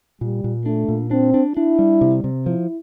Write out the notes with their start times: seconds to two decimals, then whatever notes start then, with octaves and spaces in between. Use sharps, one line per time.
0.21 A#2 G3
0.44 A#2
0.66 A3 D4
0.88 A#2
1.11 C4 D4
1.34 D4
1.57 D4 E4
1.79 G3
2.01 C3
2.24 C3
2.46 F3 E4